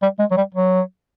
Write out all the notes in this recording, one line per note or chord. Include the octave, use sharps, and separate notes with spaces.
G3
G#3
F#3
G3
F#3